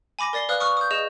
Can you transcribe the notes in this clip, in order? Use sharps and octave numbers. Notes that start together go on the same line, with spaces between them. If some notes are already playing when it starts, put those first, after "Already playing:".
G#5 B5 D6 A#6
A#4 D5 A6 C7 G7
B4 D5 F5 D#6 F6 F#6
C#6 D#6 F6
D#6 G6
G#4 D#5 E7